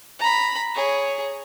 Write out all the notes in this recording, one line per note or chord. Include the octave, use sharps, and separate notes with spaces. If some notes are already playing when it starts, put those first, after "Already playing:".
A#5 B5
G#4 C#5